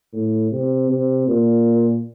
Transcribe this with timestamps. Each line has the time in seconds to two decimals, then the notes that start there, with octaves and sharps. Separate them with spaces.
0.13 A2
0.51 C3
0.89 C3
1.28 A#2